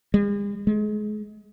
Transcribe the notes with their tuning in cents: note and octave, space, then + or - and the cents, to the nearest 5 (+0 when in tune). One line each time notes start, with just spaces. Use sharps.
G#3 -45
G#3 +30